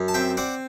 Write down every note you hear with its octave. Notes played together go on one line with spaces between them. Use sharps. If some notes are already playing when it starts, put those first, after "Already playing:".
Already playing: F#2
A5
C4 E5 G5
C4 D5 F#5